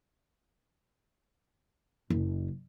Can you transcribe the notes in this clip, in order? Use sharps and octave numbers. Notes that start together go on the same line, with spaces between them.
F#1